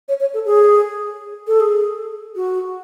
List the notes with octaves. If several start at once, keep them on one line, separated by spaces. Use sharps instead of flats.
C#5
C#5
A4
G#4
A4
G#4
F#4